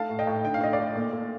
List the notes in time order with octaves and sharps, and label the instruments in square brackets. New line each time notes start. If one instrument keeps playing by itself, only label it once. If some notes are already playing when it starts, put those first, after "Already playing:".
Already playing: [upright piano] A3 F5 A5
A2
D#5 G5
A2
D3 G5
F5
A3 D#5
D5 F5
A3
A#2
A3